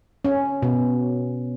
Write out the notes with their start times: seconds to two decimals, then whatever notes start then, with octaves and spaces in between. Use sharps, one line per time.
0.25 C#4
0.62 B2